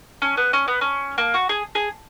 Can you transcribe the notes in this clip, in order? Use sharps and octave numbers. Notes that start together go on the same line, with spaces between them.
C#4
B3
C#4
B3
C#4
A#3
F#4
G#4
G#4